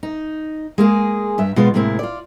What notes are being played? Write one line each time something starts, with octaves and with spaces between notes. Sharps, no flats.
D#4
G#3 A#3 G#4
G2 E5
B2 F3 G#3 B3 F4
A2 C3 G#3 A#3 C4 E4
F4 D5